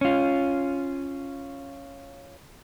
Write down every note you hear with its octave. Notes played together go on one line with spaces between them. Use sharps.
C#4 F4